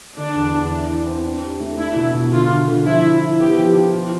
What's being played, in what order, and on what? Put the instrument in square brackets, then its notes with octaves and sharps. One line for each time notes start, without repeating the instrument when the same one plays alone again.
[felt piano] D3 [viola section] D4
[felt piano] E2
E2
E4
E4
C4
D4
G4
A3
[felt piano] D4 [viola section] E4
[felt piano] B2
B2
[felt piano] D3 [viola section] F4
[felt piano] D3
D3
[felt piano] F3 [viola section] E4
[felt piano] E4
E4
[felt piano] B3 [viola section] G4
[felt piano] F3
F3
F4